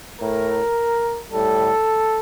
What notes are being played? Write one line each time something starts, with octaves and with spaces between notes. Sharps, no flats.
A2 A3 A#4
A2 G3 A4